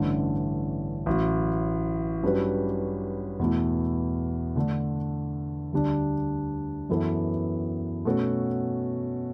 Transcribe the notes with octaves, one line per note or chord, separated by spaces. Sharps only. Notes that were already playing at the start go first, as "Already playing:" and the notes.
Already playing: A1 G2 D3 A3 C#4
A1 A2 F#3
G2 F#3 C#4 G4 B4
E2 B2 A3 E4
D3 A3 D4
D2 D3 G3 D4
F#2 E3 B3 E4 A4
B2 A3 C#4 F#4 A4